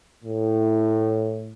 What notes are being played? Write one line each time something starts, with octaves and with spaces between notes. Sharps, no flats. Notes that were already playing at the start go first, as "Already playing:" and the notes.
A2